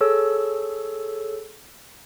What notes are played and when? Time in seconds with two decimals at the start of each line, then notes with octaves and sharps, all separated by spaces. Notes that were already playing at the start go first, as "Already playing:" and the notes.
0.01 G#4 A4 C#5 E6